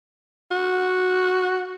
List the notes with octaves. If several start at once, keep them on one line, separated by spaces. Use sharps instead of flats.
F#4